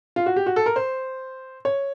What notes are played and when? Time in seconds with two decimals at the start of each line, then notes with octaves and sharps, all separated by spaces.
0.16 F4
0.26 F#4
0.36 G4
0.46 F#4
0.56 A4
0.66 A#4
0.76 C5
1.65 C#5